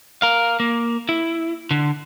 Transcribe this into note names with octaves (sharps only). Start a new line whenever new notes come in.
A#4 F5
A#3
E4
D3